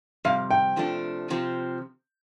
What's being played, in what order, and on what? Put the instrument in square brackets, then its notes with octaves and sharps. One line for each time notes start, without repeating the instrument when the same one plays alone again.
[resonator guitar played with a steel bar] F2 C3 G3 [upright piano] F5
[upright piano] G5
[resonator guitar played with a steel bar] C3 F3 A3 D4
C3 F3 C4